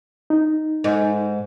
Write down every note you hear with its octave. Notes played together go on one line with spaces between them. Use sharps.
D#4
G#2